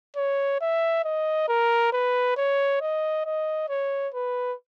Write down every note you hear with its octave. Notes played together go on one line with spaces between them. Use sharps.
C#5
E5
D#5
A#4
B4
C#5
D#5
D#5
C#5
B4